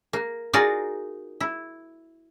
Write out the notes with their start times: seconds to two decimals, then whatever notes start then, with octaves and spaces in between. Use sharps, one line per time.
0.13 A#3
0.53 D#4 F4 F#4 G#4 A#4 D5
1.40 E4